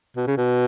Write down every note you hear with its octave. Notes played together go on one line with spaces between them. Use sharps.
B2
C#3
B2